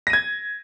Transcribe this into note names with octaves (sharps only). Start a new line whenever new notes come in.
G#6 A#6 D#7